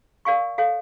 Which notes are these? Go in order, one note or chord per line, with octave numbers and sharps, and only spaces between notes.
A#4 D5 F5 G#5 C#6
A4 C#5 F5 G#5